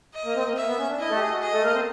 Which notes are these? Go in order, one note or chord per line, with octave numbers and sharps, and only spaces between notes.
D#5
A#3
C4
A#3
A#3 E5
B3
C#4
D4
E4 D#5
A3 A4
G4
G#4
F#4
G#4 D#5
A3 A4
A#3 A#4
C4 C5